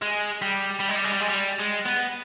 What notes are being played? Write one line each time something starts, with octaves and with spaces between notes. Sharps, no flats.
G#3
G3
G3
G#3
G3
G#3
G3
G#3
G3
G#3
B3